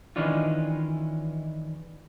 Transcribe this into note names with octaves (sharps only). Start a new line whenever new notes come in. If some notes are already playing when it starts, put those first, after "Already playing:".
D#3 E3 G#3 C#4 D4 F4